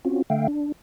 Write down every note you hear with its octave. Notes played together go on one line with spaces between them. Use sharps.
C4 C#4 F4 F#4
D3 A3 E5 F5 G5
D4